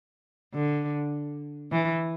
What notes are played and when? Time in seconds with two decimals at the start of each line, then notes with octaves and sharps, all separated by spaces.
0.54 D3
1.72 E3